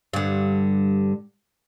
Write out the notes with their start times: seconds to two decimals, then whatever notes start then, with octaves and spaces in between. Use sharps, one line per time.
0.13 G2 D3